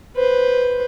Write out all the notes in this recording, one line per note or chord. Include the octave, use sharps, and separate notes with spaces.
B4 C5